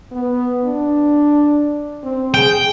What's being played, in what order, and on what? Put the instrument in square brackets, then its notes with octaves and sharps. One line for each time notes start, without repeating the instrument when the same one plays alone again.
[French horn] B3
D4
C4
[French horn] G#4 [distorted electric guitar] G5